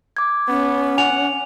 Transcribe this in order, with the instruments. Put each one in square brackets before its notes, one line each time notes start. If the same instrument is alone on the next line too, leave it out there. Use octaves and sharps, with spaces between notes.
[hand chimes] D6 G#6
[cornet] B3 [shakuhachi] C#4
[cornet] F#5 [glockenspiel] G#5 F7